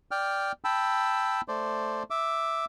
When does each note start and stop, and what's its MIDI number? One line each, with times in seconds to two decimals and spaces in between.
0.11 0.52 74
0.11 0.52 79
0.11 0.52 89
0.64 1.41 79
0.64 1.41 81
0.64 1.41 83
0.64 1.41 88
1.48 2.03 57
1.48 2.03 72
1.48 2.03 74
2.10 2.65 76
2.10 2.65 86